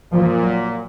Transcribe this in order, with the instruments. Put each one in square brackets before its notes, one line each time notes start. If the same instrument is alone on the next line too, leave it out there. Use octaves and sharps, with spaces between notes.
[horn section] A#2 [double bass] F3
[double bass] F#3